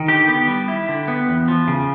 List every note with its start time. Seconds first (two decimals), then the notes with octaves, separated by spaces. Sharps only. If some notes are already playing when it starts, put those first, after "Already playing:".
Already playing: D#3
0.08 D3 G4
0.28 B3
0.48 G3
0.68 E4
0.89 D3
1.08 B3
1.29 E2
1.48 F3
1.68 C#3